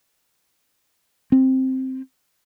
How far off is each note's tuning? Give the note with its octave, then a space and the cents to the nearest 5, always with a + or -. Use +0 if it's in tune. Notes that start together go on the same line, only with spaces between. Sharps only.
C4 +0